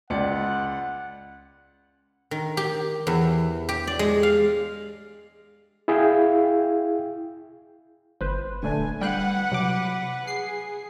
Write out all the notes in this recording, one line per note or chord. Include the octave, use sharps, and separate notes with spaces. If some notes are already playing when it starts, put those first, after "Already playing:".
C#2 D5 F#5 C#7
D#3
G4
E2
G4
D5
G#3
F5
E4 G#4 E5 F5 G5
G1 B4 C5
D#1 D3 A3 D4 G#5
G3 B4 F#5 G5 F#6
C3 F#3 D6
G#4 C7